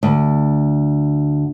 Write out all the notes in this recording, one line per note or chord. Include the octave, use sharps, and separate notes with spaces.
D2